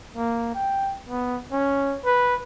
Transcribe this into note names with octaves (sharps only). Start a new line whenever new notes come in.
A#3
G5
B3
C#4
B4